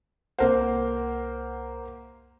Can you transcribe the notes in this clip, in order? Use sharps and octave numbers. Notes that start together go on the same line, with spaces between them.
C2 A#3 A#4 C5 F#5